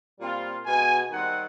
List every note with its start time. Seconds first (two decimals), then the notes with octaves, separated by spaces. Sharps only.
0.20 A#2 G3 C4 F4
0.66 B2 G#3 B3 G#5
1.11 D#3 G3 C4 F#5